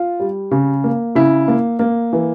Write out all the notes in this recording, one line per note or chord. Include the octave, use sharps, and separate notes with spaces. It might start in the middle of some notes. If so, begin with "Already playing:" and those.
Already playing: F4
G3
C#3
A#3
C#3 E4
A#3
A#3
E3